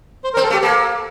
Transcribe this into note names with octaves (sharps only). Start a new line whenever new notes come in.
C5
A#4
C4
A4
A3
G4
A#3 A4